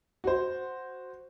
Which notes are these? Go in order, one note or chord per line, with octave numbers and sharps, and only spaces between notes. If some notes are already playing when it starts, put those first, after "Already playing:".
F#4 C5